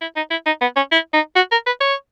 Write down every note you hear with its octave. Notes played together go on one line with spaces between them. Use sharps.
E4
D#4
E4
D#4
B3
C#4
E4
D#4
F#4
A#4
B4
C#5